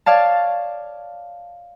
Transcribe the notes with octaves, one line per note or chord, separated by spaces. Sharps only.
C#5 D5 F5 A5